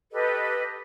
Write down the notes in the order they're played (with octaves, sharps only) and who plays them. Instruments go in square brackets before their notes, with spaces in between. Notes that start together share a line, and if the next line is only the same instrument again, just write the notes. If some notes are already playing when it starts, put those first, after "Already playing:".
[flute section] G4 A4 B4 D#5